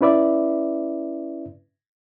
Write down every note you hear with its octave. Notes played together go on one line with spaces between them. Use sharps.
C#4 E4 B4 D5 E5